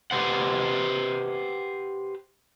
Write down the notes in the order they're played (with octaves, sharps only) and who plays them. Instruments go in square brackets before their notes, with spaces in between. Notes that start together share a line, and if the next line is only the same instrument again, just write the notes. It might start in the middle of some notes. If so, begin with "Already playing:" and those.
[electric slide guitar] G4 B4 C5 F#5